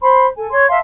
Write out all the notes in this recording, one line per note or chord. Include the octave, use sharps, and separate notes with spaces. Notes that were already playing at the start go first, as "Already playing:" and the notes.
C5 B5 C6
A4 G#5
C#5 C6
E5 F5 A5 C6